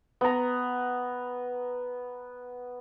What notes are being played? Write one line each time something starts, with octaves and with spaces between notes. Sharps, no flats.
B3 A#5